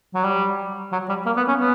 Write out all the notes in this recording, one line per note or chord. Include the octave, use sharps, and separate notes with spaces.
F#3
G3
F#3
G3
A#3
B3
C#4
B3